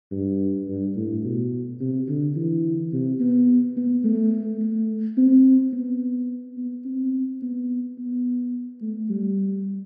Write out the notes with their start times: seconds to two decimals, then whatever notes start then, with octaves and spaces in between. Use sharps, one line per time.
0.11 G2
0.68 G2
0.96 A2
1.24 B2
1.80 C3
2.08 D3
2.36 E3
2.93 C3
3.20 B3
3.77 B3
4.04 A3
4.61 A3
5.17 C4
5.73 B3
6.57 B3
6.85 C4
7.42 B3
7.98 B3
8.81 A3
9.10 G3